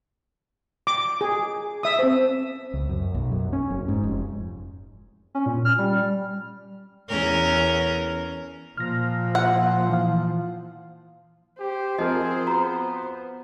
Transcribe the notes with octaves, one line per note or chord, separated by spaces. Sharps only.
D6
G#4
E5 D#6
C4 C5
C#2
F#2
B1
F#2
C#4
F#1
G#2
F1
C#4
A#2
F6
G3
E2 C#4 A#4
A#2 F3 F6 A#6
F#5
E3 F5
G4 C5
F3 C4 G#4 A#4 D#5
B3 F#4 A#5